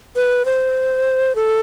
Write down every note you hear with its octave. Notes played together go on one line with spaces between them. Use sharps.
B4
C5
A4